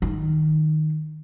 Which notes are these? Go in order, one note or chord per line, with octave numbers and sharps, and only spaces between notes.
D#3